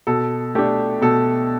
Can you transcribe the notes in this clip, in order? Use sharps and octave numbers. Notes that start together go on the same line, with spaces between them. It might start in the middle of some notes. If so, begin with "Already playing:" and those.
B2 A4
A3 D4 G4
B2 A4